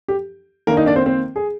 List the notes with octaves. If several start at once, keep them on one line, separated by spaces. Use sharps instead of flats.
G4
D#3 A#3 D4 A#4
D#4 D#5
D4 D5
C4 C5
C4 C5
G#4